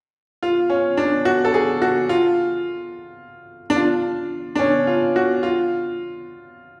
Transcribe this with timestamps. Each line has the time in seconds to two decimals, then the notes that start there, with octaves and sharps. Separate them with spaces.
0.43 F4
0.70 C#4
0.97 D4
1.25 F#4
1.45 A4
1.54 G#4
1.82 F#4
2.09 F4
3.70 D4
3.76 F4
4.55 D4
4.59 C#4
4.87 F4
5.16 F#4
5.43 F4